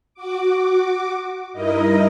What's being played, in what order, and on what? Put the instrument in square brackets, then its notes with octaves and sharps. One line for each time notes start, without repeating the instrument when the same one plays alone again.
[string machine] F#4 D6
G2 D#4 E4 A#4 D#5